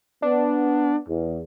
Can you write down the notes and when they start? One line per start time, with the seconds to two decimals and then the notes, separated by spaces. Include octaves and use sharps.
0.22 B3 D4
1.07 E2